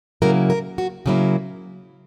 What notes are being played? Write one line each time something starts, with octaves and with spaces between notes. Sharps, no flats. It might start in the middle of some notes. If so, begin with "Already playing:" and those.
C#3 F#3 A#3 E4 A#4
A#4
F#4
C#3 F#3 A#3 E4